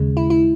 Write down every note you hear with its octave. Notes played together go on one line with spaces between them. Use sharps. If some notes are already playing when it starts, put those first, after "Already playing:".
Already playing: D#2 C#3 G#3
E4
E4